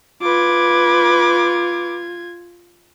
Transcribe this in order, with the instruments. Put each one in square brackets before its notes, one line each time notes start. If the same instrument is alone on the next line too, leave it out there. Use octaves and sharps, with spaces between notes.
[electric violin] F4 G#6 [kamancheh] B4 D6